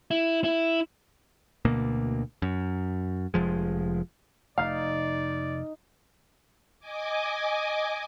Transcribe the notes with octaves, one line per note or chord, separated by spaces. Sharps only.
E4
E4
D2 B2 A#3
F#2
F1 F3 G#3
F1 A3 D#4 D5 F5
D#5 G#5 D6